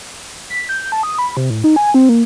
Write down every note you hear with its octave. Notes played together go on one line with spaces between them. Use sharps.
B6
G6
A5
D#6
B5
C3
A2
D#4
G#5
C4
A#3